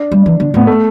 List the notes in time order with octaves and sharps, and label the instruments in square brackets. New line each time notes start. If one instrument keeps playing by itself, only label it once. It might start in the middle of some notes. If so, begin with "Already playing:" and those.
Already playing: [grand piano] D4
[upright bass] G3
E3
D3
[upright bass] A2 [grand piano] B3
[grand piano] A3